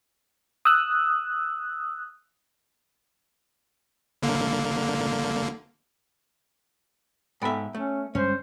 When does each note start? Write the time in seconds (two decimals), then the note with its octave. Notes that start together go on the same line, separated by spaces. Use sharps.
0.65 D#6 E6 F#6
4.22 G1 D3 A#3
7.42 G#2 B3 A4 E5 G5
7.75 A3 C#4
8.15 G1 G2 G#3 C#4 C5